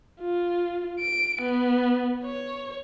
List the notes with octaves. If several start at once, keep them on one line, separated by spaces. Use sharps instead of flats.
F4
D7
B3
C#5